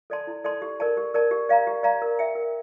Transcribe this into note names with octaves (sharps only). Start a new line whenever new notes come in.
A4 D5 A5 C6
E4
A4 D5 A5 C6
G4
A#4 D5 A5
G4
A#4 D5 A5
G4
D5 F5 A#5
G4
D5 F5 A#5
A#4
E5 G5
A#4